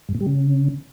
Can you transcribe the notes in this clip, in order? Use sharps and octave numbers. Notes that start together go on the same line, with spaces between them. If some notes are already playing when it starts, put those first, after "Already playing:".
G2
A#2
G3
C#3